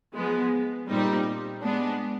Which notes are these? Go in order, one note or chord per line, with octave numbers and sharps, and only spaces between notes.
F3 G#3 B3
A#2 G3 C4 D#4
G#3 B3 D4